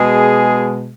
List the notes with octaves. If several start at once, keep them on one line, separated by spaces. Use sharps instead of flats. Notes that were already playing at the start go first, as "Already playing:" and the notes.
Already playing: B2 G#3 G#4